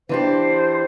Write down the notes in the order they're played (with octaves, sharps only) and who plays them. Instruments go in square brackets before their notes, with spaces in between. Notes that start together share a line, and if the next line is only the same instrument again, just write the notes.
[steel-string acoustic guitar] E3 D4 G4 [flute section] C5